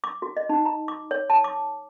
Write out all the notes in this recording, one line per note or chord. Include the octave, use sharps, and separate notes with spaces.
D6
F#4
D#5
D#4
A#5
D6
C#5
A5
D6